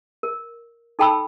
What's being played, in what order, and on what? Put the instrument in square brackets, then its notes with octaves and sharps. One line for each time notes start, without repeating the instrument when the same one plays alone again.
[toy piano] A#4
D#4 A4 G5 A5 B5 E6